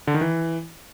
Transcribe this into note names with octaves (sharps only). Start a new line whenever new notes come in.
D3
D#3
E3